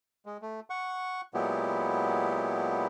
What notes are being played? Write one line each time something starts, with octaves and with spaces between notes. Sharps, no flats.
G#3
A3
F#5 C#6
A#2 F#3 G#3 B3 E4 G4